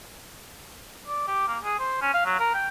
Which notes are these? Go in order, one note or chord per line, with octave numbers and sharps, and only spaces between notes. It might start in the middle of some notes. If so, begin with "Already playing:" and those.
D5
G4
A#3
G#4
C5
C#4
F5
F#3
A#4
G5